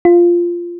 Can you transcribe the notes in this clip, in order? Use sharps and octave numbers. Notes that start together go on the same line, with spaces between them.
F4